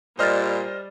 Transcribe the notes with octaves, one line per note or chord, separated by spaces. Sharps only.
A#2 G3 C5 D5 D#5 F6 A6